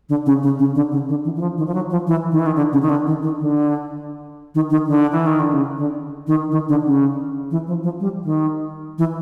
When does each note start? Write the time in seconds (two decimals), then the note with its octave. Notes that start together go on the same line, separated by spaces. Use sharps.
0.09 D3
0.26 C#3
0.43 C#3
0.59 C#3
0.75 D3
0.92 C#3
1.09 D3
1.24 E3
1.36 E3
1.41 F3
1.58 D#3
1.67 F3
1.74 F#3
1.90 F3
2.07 E3
2.31 D#3
2.39 E3
2.46 D#3
2.56 D3
2.73 C#3
2.82 D#3
2.89 D3
3.06 D#3
3.22 D#3
3.39 D3
4.55 D#3
4.70 D#3
4.87 D3
5.12 E3
5.26 D#3
5.40 D3
5.53 C#3
5.78 D3
6.27 D#3
6.52 D#3
6.69 D3
6.85 C#3
7.51 E3
7.67 F3
7.83 F3
8.00 G3
8.24 D#3
8.98 E3